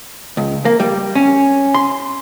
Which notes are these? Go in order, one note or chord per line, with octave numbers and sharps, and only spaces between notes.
C#2
A#3
G3
C#4
C6